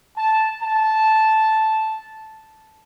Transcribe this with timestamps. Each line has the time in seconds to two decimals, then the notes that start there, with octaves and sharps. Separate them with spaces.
0.17 A5
0.62 A5